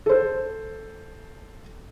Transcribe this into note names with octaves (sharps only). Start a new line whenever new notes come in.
A4 C5